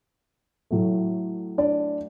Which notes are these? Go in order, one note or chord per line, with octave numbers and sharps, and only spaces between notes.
A2 F#3 A3
D4 D5